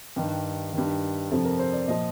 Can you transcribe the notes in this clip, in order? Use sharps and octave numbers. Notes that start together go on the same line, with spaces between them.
G2 D#3 G4
G2 D#3
F2 C3 F3 A4
A#4
C5
D5
A#2 F3 D#5